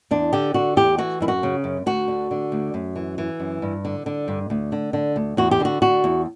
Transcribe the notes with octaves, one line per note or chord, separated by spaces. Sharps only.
E2 D4
D3 G4
D3 F#4
E2 G4
E3 F#4
F#2 E4
F#4
C#3
F#2
D2 F#4
D3
D3
D2
F#2
E3
E3
F#2
G2
D3
D3
G2
D2
D3
D3
D2
E2 F#4
G4
D3 F#4
D3 F#4
E2